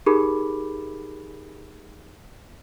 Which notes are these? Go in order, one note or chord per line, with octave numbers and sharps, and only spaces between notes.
D#4 G4 G#4 A#4 B5 D6